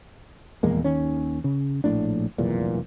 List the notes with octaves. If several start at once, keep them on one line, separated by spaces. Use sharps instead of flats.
D#1 E2 G#3 A#3
D#2 D#3 C#4
C#3
A#1 A2 D4
F1 B1 E2 A#2